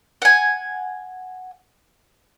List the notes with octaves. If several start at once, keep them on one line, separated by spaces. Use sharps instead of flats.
F#5 G#5